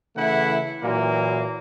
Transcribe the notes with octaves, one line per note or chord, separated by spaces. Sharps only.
C#3 E3 A3 E4 F#5
A#2 E3 F#3 A#3